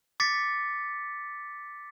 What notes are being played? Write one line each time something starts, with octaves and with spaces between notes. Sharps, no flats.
D6 A6 B6 C#7